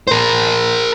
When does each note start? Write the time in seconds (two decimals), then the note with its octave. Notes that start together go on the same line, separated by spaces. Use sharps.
0.08 A#4 C5